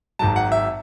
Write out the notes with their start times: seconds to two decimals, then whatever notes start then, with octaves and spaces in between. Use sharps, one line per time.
0.19 G#1 G#2 F#3 A5
0.36 F#5
0.52 E5